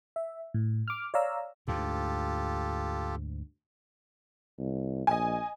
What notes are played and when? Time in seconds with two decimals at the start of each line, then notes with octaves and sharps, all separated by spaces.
0.16 E5
0.54 A2
0.88 D6 F6
1.14 C#5 D5 F5 A#5 E6
1.68 D2 G#2 F4 G4 A4
4.59 C2
5.07 A#1 D#5 G#5